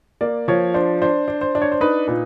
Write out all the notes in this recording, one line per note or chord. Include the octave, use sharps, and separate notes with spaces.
A#3 D5
F3 C#5
D4 C5
D4 C5
D4
C5
D4
C#5
C5
D#4 B4
A#2 B4